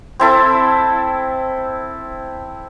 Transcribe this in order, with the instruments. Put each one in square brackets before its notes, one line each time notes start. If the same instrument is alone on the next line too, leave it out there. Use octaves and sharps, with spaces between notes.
[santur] C4 E4 A4